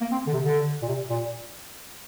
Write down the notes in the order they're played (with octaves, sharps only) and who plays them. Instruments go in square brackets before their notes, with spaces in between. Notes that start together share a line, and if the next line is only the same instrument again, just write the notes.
[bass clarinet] A#3
C4
D3
C3
D3
A#2
C3
A#2